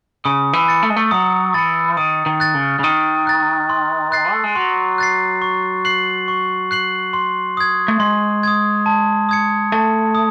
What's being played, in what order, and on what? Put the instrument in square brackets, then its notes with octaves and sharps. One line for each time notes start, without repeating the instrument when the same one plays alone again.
[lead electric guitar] C#3 [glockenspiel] D#6
[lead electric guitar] E3
[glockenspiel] A6 C#7
[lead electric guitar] A3
G#3
A3
[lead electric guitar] F#3 [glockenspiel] D#6
[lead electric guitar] E3 [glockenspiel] A6 C#7
[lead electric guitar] D#3 [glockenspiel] D#6
[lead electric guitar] D#3
[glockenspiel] F#6 A6
[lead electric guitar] C#3
C#3
[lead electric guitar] D#3 [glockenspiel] D#6
[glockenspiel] F#6 A6
C6
F#6 A6 C7
[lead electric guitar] A3
G#3
[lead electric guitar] F#3 [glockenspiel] C6
[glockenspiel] F#6 A6 C7
C#6
F#6 C7 F#7
C#6
F#6 C7 F#7
C6
D#6 G#6
[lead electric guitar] A3
[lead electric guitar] G#3 [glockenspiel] C6
[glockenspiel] D#6 G#6
A5
D#6 G#6 C#7
[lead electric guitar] A3 [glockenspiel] A5
[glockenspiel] D#6